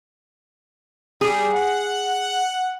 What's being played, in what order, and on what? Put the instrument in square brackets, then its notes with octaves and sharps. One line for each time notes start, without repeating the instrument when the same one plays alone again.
[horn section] G3 [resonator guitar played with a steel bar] G#4
[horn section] F#5